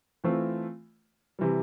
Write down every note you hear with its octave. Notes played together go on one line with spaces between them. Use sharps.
E3 A3 C4 F4
C3 E3 G3